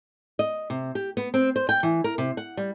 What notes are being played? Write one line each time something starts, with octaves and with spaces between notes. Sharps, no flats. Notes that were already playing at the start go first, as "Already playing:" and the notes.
D#5
C3
G4
B3
C4
C5
G5
E3
A#4
C3
F#5
G3